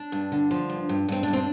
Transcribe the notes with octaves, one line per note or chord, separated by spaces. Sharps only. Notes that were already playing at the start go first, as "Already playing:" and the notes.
Already playing: D4
G2
D3
F3
G2
G2
G2 C4
G2 D4
C4
D4